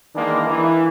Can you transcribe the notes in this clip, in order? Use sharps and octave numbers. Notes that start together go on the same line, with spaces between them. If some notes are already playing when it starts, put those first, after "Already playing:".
D#3 E3 G#3 A#3 D4
E3